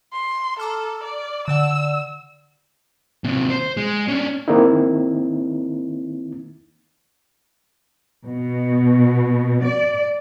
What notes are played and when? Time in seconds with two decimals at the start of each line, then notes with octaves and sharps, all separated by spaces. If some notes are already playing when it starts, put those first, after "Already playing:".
0.13 C6
0.59 A4 A#5 D6 F6
1.03 D5
1.48 D3 D5 F#5 E6
3.24 D#2 C3
3.50 C5
3.77 G#3
4.08 C#4 D4
4.48 D#3 A#3 C4 D#4 E4
8.27 B2
9.64 D5